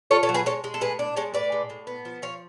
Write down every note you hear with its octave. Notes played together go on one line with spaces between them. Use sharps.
F4 A4 C#5
A4 C#5
F#3
G#4 B4
G#3 A4 C#5
G#3
A4
A2 G#4 B4
D4
G#3 A4 C#5
A2 B4 D5
G#3
A2
B3
F3
F3 C#5 F5